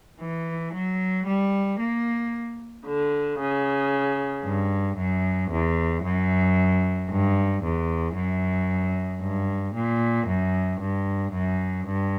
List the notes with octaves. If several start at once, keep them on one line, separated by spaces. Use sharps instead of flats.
E3
F#3
G3
A#3
D3
C#3
G2
F#2
E2
F#2
G2
E2
F#2
G2
A#2
F#2
G2
F#2
G2